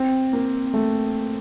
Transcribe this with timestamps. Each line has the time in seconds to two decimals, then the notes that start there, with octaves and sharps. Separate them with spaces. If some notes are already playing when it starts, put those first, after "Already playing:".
Already playing: C4
0.33 A#3
0.74 A3